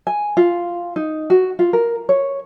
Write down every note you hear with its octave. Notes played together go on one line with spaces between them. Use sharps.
G#5
F4
D#4
F#4
F4
A#4
C#5